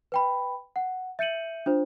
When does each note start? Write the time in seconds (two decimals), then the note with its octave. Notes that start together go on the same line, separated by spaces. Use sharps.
0.12 B4 G5 B5
0.76 F#5
1.19 E5 G6 C#7 D#7 F#7
1.66 D4 F4 C5